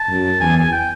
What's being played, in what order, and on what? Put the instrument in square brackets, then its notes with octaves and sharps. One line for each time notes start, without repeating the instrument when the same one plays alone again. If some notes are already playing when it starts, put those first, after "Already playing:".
Already playing: [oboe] A5
[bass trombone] F#2
[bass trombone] E2 [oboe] G#5
[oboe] G#5
G5